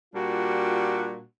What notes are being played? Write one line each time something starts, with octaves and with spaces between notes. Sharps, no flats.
A#2 G3 D4 F4 F#4